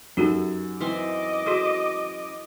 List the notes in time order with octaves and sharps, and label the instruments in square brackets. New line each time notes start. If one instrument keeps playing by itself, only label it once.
[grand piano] F#2 [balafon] D#4 G4 A4
[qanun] E3 C4 C6 [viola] D#5 D6
[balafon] F#4 G#4 A4 [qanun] C5